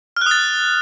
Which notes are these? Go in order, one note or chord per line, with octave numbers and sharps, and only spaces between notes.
D#6 F6 F#6 A6